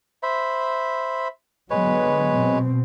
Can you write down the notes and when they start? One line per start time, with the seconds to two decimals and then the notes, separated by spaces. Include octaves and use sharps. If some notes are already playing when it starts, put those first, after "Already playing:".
0.23 C5 E5 B5
1.70 D3 F#3 G#3 B3 B4 C#5
2.35 B2 C4